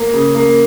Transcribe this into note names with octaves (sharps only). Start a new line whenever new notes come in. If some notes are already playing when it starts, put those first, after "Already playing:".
Already playing: A#3
C#3
A#3